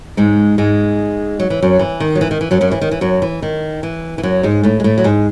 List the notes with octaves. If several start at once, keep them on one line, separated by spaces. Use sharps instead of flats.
G#2 G#3
G#2 G#3
F#3
E3
F#2 F#3
E3
D#3
F#3
E3
D#3
E3
F#2 F#3
F#2 F#3
E3
D#3
E3
F#2 F#3
E3
D#3
E3
E3
F#2 F#3
G#2 G#3
A2 A3
G#3
A2 A3
F#3
G#2 G#3